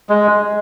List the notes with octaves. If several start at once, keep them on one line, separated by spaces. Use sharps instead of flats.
G#3